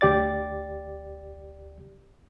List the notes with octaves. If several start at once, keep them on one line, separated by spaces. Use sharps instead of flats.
D2 G4 D5 A6